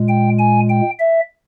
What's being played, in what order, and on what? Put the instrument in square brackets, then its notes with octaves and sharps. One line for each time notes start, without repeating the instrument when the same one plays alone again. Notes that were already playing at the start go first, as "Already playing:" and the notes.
Already playing: [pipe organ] A#2 G#3
G5
G#5
G5
E5